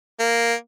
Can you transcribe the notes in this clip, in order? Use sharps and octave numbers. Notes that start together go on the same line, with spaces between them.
A#3